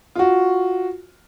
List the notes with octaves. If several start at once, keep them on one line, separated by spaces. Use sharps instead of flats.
F4 F#4